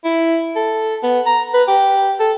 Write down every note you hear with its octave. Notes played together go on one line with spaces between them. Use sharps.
E4
A4
B3
A#5
B4
G4
A4